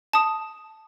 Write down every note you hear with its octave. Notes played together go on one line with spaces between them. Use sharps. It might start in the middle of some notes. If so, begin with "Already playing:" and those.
A5 D#6